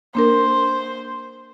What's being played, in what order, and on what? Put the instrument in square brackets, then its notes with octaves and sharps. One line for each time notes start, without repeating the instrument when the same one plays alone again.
[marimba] A#3 D4 A#4 [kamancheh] C5